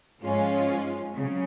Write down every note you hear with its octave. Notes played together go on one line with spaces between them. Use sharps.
G#2 F3 G#3 C#4 F4
C#3 F#3